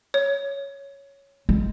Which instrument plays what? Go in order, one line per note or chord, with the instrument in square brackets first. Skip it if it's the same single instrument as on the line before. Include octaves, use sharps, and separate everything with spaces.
[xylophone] C#5
[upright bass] G#3